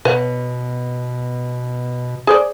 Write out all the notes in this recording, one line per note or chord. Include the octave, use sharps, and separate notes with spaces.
B2 B4 C#5 F#5
G#4 C5 D5